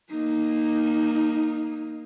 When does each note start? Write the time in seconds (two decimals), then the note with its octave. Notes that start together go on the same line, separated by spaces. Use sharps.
0.10 A#3 D#4